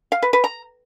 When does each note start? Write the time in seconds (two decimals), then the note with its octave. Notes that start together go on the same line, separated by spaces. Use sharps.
0.12 F5
0.22 B4
0.33 B4
0.44 A#5